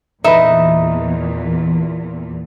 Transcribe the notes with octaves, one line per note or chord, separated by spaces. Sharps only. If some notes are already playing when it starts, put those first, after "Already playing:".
E2 A#2 E3 D#4 B4 D#5 E5